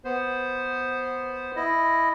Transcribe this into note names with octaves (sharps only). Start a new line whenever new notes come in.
B3 C5
E4 D#5